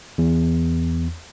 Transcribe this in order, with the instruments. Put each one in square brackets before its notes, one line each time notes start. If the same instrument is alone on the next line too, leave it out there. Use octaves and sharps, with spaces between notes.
[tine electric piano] E2